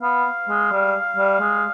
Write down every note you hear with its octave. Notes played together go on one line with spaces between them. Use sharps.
B3 F5
G#3
G3
G3
G#3